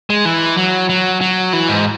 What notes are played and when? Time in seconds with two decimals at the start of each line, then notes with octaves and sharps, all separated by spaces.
0.10 G#3
0.25 E3
0.57 F#3
0.89 F#3
1.21 F#3
1.53 E3
1.69 G#2